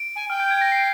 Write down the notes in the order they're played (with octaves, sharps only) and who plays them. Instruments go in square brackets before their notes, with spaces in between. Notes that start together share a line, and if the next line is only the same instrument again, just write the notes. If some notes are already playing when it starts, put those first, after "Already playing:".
Already playing: [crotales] D7
[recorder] G#5
[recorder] G5 [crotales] F6
[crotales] G6
G#6
A#6
C7